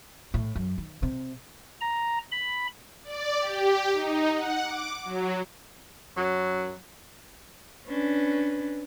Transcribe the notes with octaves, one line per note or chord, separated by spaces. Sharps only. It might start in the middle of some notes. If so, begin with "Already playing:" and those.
A2
F#2
D#3
C3
A#5
B5
D5
G4
D#4
F#5
D6
F#3
F#2 F#3
C#4 D4 B4